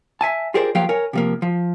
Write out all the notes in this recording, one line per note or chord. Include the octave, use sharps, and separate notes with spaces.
E5 G#5 A5
F4 G4 G#4 A#4 C5 D5
F3 F#3 A#3 G4 F5 G5
A#4 C#5 G#5
C3 F3 A#3
F3